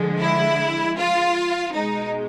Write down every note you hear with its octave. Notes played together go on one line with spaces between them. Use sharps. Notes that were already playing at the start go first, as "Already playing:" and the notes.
Already playing: D3 F3 G#3
E4
F4
B2 G#3 D#4